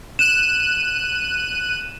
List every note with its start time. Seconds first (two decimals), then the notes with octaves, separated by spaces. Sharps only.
0.19 F#6 D#7 E7